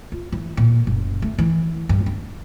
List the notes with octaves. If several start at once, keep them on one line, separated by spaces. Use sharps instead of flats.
F4
E3
A#2
F#1
A3
E3
G2
D4